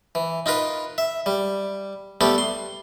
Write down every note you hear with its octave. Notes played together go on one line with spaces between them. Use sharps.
E3
D#4 F4 A#4 B4
E5
G3
G3 A3 B3 G4 A4
C6